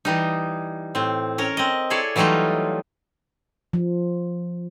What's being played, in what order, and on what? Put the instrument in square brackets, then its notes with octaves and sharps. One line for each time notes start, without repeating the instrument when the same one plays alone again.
[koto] E3 G3 D#4
A2 C4
C#4 A#4 C#5
C4 D#5
E4 G#4 A4 C#5 D5
E3 F#3 G3 A3 D#4 F4
[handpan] F3